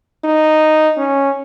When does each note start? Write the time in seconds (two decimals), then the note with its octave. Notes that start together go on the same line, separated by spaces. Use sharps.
0.24 D#4
0.97 C#4